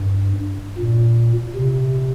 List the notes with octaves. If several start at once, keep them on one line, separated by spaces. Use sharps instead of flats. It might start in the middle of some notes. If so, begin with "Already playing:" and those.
Already playing: G2
A#2
C3